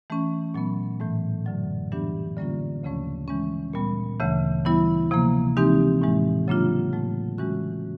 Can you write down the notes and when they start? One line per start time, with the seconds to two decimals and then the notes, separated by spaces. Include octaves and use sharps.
0.10 E3 A3 C#4
0.54 A#2 F#3 B3
1.00 A2 E3 A3
1.46 F#2 D3 F#3
1.92 E3 G3 B3 D4 G4
2.37 D3 G3 A#3 C#4 F4
2.83 D2 C#3 F3 A3 C#4
3.28 E3 G#3 C#4
3.73 A#2 G3 B3
4.20 D2 C#3 E3 A3
4.65 E3 G3 B3 E4
5.11 C3 F3 A#3
5.57 E3 G#3 C4 D#4 G4
6.02 A2 E3 G#3
6.48 C#3 F#3 A#3 D4 F4
6.93 A2 F#3 A3
7.38 C#3 E3 G#3 C#4 F#4